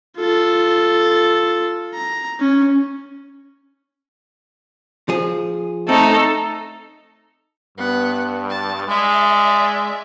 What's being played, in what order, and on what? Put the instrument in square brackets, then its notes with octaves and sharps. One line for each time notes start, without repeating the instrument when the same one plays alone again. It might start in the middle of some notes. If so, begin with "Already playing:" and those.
[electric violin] F4 A4
A#5
C#4
[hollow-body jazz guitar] F3 G#4
[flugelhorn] A3 [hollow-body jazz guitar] C4 [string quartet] D#4 [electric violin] A4
[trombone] G2 [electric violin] B3 F#5
[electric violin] A5
[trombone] G#3 [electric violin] D5 E5